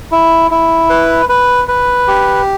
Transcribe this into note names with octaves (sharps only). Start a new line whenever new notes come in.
E4
E4
B4
B4
B4
G4